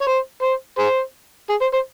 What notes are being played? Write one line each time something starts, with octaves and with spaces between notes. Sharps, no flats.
C#5
C5
C5
G#4 C5
G#4
C5
C5